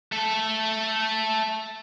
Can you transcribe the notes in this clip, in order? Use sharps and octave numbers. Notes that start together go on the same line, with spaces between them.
A3 A4